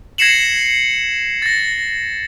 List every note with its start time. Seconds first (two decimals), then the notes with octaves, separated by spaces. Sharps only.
0.18 G#6 A#6 C7 C#7 E7 F#7
1.42 A6 A#6